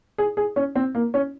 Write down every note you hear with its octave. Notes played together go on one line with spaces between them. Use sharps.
G#4
G#4
C#4
C4
A#3
C#4